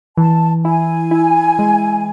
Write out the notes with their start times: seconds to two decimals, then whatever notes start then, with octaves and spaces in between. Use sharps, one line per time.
0.17 E3 A5
0.65 E4 G#5
1.11 E4
1.59 G#3